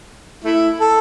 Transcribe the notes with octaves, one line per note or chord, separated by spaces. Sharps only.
A3 E4
A4